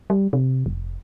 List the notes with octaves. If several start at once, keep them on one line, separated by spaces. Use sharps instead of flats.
G3
C3
F1